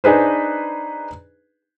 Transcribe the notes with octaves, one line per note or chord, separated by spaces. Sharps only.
D4 D#4 G#4 B4 C5